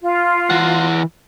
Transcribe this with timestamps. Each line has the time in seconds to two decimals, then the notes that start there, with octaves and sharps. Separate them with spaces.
0.01 F4
0.50 E3 F#5